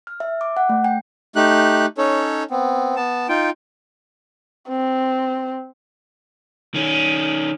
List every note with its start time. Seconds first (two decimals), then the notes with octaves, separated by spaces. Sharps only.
0.07 F6
0.20 E5
0.41 D6
0.57 F#5
0.69 A3
0.84 G5
1.36 A3 D#4 G4 F#6
1.98 C#4 D#4 A4 C#5
2.51 B3 C4
2.96 B3 A5
3.29 D#4 F4 G5
4.68 C4
6.74 D#3 C#4